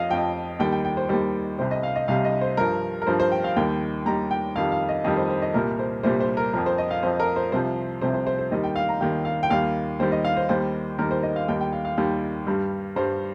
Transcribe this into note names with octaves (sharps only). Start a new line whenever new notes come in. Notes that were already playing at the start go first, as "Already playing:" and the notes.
Already playing: F2 F3 D#5 F5
F2 F3 G5
D#2 D#3 G3 G5
G5
G5
C5
D#2 D#3 G3 C5
C2 C3 G3 C5
D#5
F5
D#5
C2 C3 G3 F5
D#5
C5
G2 F3 A#4
A#4
G2 F3 C5
C5
G5
F5
D#2 D#3 G3 G5
D#2 D#3 G3 A#5
G5
F2 D#3 G3 F5
F5
D#5
F2 D#3 G3 D#5
C5
C5
D#5
C2 A#2 G3 A#4
C5
C2 A#2 G3 C5
C5
A#4
F2 F3 A#4
C5
D#5
F5
F2 F3 C5
A#4
C5
C2 C3 F3 C5
C2 C3 F3 C5
C5
C5
C5
D#2 D#3 G3 D#5
G5
F5
A#5
D#2 D#3 G3 G5
F5
G5
D#2 D#3 G3 F5
D#2 D#3 G3 C5
D#5
F5
C5
D#2 D#3 G3 C5
D#2 D#3 G3 A#4
C5
D#5
F5
D#2 D#3 G3 G5
G5
F5
F5
D#2 D#3 G3
G2 G3
G2 G3 C5